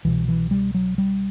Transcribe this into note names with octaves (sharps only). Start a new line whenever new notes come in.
C2 B2 E3
E3
G3
F#3
G3